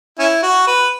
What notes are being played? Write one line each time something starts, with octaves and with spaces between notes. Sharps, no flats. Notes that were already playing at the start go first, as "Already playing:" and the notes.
C#4 E4
F#4
B4